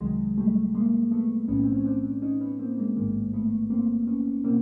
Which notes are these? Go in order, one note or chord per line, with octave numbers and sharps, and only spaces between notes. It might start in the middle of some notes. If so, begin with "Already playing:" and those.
C2 C3 D#3 F#3 G#3
G3 A3
G#3 A#3
A3 B3
B1 A2 E3 B3 C#4
C4
C#4
C4 D4
C#4 D#4
B3 C#4
A#3 C4
G#3 A#3
A1 G#2 D#3 G#3 A#3
A3 B3
A#3 C4
B3 C#4
B2 A#3 C4